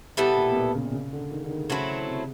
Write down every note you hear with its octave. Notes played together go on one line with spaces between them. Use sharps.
B2 G3 B3 E4 A4
A#2
B2
A#2
C#3
C3
C#3
D3
D#3
D3
D#3
C#3 F#3 A3 C4 E4
C3